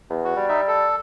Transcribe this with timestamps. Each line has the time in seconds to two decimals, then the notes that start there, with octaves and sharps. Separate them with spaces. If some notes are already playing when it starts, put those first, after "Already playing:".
0.10 E2
0.24 F#4
0.36 G3
0.49 D#4 E5
0.68 A4